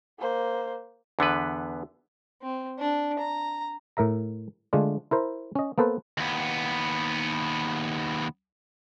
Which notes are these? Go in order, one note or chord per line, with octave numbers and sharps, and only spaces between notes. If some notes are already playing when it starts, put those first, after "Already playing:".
A#3 C5
E2 D3 B3 B4
C4
D4
A#5
A2 A#4 E5 A#5
D3 G#3 A3 D4 F4
E4 A#4 C5
C#4 D#5
A#3 B3 A4 B4 C5
D#2 B3